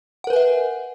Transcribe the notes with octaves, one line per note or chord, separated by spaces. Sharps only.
A#4 B4 E5 F#5 G#5